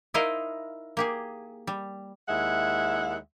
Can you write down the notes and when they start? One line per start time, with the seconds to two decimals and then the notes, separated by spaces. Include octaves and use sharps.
0.14 D#4 E4 A#4 C5 D#5 F5
0.97 A#3 G4 G#4
1.67 G3
2.29 D#2 G#3 E4 E5 F#5